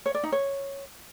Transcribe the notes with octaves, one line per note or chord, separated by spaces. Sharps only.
C#5
D5
D#4
C#5